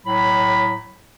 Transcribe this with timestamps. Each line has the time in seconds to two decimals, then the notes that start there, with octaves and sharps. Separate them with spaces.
0.07 A2 F#3 B5